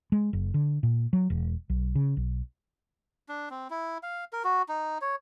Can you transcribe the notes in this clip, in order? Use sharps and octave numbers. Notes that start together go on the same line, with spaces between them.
G#3
F#1
D3
A#2
F#3
E1
B1
C#3
B1
D4
C4
E4
F5
A#4
F#4
D#4
C#5